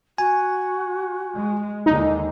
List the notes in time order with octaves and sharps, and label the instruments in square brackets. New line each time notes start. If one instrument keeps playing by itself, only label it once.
[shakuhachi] F#4 [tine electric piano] G#5
[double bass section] G#3
[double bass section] D#2 D3 G#3 [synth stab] D#4